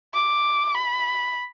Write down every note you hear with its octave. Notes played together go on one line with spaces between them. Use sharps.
D6
B5